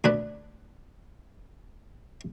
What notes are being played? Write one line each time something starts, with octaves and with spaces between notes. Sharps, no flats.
D2 D4 B4